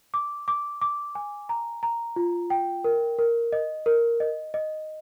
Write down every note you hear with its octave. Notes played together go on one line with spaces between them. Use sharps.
D6
D6
D6
G#5
A#5
A#5
F4
G5
A#4
A#4
D#5
A#4
D#5
D#5